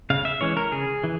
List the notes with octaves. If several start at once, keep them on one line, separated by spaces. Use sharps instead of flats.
C#3 F5
E5
E3 G#3 C#4 C#5
A#4
C#3 G#4
E3